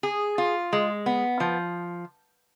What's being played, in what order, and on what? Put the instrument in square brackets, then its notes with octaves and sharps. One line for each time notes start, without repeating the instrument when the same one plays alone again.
[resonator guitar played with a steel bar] G#4
F4
G#3
B3
F3